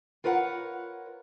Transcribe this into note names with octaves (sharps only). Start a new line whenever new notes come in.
F4 A#4 B4 C#5 F#5